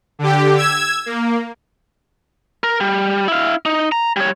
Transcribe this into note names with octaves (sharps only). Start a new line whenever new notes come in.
D3 G4
E6 G#6
A#3
A#4
G3
E4 F5
D#4
A#5
G3 C#5